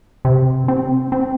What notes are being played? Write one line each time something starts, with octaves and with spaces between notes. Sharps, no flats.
C3
C4
C4